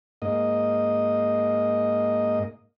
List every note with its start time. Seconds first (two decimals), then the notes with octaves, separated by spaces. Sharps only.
0.22 G#2 A#3 D#5